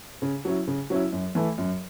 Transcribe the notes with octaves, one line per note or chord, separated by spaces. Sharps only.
C#3
F#3 C#4 E4
C#3
F#3 C#4 E4
F#2
E3 A3
F#2